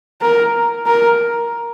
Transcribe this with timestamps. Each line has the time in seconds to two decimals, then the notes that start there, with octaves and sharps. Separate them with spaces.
0.22 A#4
0.86 A#4